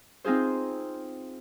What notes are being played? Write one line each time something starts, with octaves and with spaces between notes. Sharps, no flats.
C4 D#4 F4 G#4 C5